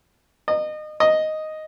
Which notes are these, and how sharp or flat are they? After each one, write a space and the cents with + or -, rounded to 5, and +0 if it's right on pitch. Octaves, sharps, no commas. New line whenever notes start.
D#5 -30
D#5 +0